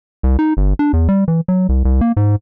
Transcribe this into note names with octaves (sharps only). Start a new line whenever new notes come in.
C2
D#4
G1
D4
E2
G3
E3
F#3
C2
C2
A#3
G#2